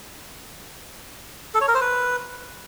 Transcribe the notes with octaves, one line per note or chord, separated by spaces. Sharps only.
A4
C#5
A#4
C5
B4